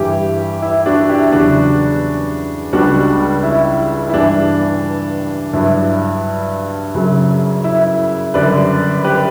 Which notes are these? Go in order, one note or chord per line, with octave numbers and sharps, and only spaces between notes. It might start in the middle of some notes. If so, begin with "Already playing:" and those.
Already playing: G2 E3 G3 E4 G4
E4
D4 F#4
E4 G4
E2 C#3 F#3 D4 F#4
C#2 C#3 G3 D4 F#4
E4
E4
G2 E3 G3 D4
G2 F#3 E4
F#2 C#3 F#3
E4
F#2 D3 G3 B4 D5
G4 B4